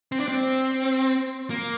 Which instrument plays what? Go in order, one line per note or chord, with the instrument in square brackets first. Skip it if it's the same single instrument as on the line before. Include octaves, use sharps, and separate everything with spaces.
[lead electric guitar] C4
D4
C4
A#3